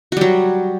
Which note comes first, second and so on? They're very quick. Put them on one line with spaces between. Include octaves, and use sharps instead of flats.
F#4 G3 F#3